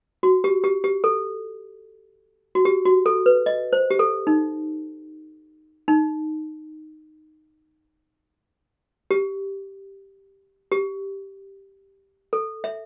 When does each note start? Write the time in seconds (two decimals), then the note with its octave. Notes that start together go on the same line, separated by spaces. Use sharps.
0.23 F#4
0.44 G4
0.64 G4
0.84 G4
1.04 A4
2.55 F#4
2.65 G4
2.85 F#4
3.06 A4
3.26 B4
3.46 D#5
3.73 C5
3.90 G4
3.99 A4
4.27 D#4
5.88 D#4
9.11 G4
10.72 G4
12.33 A4
12.64 E5